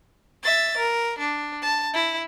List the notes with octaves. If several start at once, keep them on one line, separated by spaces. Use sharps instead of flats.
E5 A6
A#4
D4
A5
E4